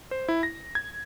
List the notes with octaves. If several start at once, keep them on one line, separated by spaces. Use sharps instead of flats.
C5
E4
A#6
G#6